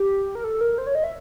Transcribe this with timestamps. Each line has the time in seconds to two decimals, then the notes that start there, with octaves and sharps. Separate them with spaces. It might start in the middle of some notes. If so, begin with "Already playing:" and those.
Already playing: G4
0.35 A#4
0.44 A4
0.61 A#4
0.78 C5
0.87 C#5
0.95 D#5
1.04 E5